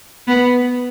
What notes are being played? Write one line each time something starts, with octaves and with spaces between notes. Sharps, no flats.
B3